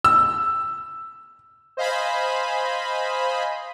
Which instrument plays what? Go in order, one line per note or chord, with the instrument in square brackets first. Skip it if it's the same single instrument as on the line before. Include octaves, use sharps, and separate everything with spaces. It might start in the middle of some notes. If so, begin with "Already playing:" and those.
[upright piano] E6
[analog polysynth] C5 D#5 F5 G#5 B5